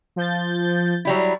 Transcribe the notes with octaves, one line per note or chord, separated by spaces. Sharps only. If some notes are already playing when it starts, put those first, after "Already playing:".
F3 G6 A6
F#3 G3 E4